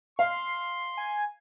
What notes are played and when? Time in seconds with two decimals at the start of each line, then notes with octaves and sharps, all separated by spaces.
0.19 F5 C6
0.97 G#5